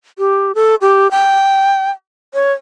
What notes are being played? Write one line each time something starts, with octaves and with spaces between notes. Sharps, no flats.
G4
A4
G4
G5
C#5